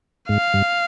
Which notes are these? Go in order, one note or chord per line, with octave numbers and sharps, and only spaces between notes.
G#2 F5
G2